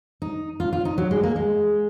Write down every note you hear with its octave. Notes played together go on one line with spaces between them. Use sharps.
D#4
F4
F4
D#4
F#3
G#3
A#3
G#3